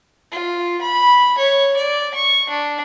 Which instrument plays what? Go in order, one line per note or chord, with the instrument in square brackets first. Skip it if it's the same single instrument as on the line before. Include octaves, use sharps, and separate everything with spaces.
[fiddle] F4
B5
C#5
D5
C#6
D4